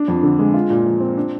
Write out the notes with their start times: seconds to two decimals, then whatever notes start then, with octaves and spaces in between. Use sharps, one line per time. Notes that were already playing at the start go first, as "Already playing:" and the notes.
Already playing: D4
0.08 F2
0.23 D3
0.39 G#3
0.54 F4
0.70 A#2
0.86 F3
1.01 C4
1.17 D4